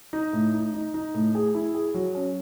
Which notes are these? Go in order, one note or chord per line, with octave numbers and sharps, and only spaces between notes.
D#4
A2
D#4
D#4
D#4
A2
G#4
E4
G#4
F#3
C#4